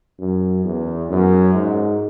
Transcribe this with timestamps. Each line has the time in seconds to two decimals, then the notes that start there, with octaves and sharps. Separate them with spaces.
0.20 F#2
0.64 E2
1.10 F#2
1.54 G#2